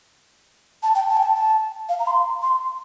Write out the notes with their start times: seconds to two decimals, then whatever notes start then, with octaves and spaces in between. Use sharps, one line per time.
0.83 A5
0.95 G5
1.09 A5
1.17 G5
1.23 A5
1.35 A5
1.89 F5
1.99 A#5
2.07 C6
2.42 C6